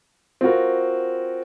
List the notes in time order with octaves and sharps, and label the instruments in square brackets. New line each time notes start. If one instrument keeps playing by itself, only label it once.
[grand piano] C4 F4 F#4 A#4